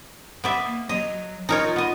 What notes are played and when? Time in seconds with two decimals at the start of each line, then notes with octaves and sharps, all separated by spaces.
0.44 B3 D5 E5
0.65 A#3
0.89 F#3 D#5
1.49 D#4 F4 A#4 C#5
1.76 B3 D#5